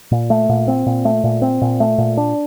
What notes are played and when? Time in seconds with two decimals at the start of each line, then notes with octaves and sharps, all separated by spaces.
0.12 A#2
0.30 A3
0.49 A#2
0.68 C4
0.86 A#2
1.05 A3
1.24 A#2
1.42 C4
1.62 A#2
1.80 A3
1.98 A#2
2.17 D4